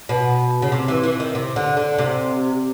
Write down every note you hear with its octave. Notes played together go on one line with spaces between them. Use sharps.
B2
C#3
C3
E3
E3
D#3
C3
D3
D3
C3